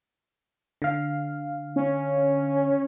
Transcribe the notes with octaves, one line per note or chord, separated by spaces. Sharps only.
D3 F5
C#4